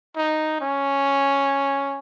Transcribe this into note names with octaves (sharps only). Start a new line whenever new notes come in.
D#4
C#4